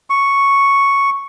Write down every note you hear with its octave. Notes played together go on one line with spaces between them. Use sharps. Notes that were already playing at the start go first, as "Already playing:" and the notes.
C#6